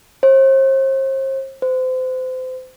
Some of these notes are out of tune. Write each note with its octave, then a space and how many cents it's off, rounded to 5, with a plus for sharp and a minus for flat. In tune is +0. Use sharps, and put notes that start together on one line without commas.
C5 +40
C5 -30